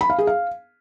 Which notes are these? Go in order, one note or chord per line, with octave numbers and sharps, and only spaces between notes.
B5
F5
G#4
F5